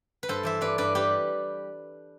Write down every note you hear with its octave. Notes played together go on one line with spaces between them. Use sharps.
B4
G2 A4 C5
E3 C5 E5
G2 B4 D5
G2 B4 D5
G3 G4 B4